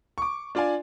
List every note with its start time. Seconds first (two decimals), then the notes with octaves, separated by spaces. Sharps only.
0.18 C#6 D6
0.55 D4 F4 D5 F5 G#5